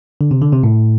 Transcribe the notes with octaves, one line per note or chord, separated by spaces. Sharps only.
D3
C3
D3
C3
A2